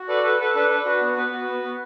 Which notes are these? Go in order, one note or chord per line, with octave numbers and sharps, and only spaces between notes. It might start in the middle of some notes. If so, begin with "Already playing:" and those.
Already playing: F#4
A4 B4 D5
A4 B4
A4 B4
D4 B4
D4 B4
F#4 B4
B3
B3 B4
F#4
B3
B3